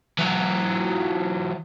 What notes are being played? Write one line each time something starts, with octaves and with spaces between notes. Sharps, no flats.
E3 F#3